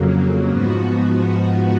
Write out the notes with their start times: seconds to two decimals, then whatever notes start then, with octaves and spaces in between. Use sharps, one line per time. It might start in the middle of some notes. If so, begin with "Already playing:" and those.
Already playing: F2 C#3 F#3 A#3
0.48 G#2 F3 B3 F#4